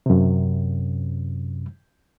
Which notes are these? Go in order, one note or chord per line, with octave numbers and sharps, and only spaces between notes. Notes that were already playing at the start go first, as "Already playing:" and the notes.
F#2 C3